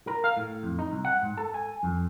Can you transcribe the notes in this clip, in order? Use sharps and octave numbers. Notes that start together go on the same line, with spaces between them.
A#4
F5
A2
F2
D#4
C2
F#5
G#2
A4
G#5
F2